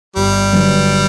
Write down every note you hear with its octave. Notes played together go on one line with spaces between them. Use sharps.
G1 G3
G2 D3 F#3